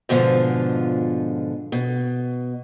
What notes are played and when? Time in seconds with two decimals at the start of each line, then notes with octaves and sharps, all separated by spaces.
0.09 G#2 B2 D3 F3 F4
1.72 B2